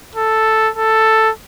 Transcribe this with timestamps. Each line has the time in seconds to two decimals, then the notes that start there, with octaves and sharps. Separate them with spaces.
0.15 A4
0.76 A4